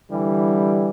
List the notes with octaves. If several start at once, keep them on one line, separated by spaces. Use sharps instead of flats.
D3 E3 G3